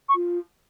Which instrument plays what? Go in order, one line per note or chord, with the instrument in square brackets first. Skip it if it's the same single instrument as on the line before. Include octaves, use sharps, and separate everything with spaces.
[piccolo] C#6
[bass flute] F4